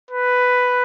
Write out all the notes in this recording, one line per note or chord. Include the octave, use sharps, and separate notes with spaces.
B4